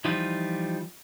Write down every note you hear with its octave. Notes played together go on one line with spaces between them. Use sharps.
E3 F3 G3 D#4 F4